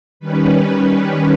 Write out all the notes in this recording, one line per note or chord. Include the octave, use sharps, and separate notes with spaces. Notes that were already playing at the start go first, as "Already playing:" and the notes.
D#3 G3 C#4 B4